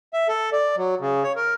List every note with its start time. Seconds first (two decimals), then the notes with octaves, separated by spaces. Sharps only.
0.13 E5
0.28 A4
0.53 D5
0.77 F#3
1.01 C#3
1.23 C#5
1.36 A#4